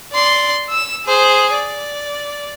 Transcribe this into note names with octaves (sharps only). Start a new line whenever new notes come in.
D5 C6
E6 E7
G#4 C5
D5